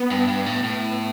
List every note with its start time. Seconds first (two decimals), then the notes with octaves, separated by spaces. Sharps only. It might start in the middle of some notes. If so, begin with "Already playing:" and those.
Already playing: B3
0.11 G2
0.28 G2
0.46 A2
0.63 A2